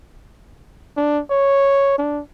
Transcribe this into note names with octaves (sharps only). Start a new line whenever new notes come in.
D4
C#5
D4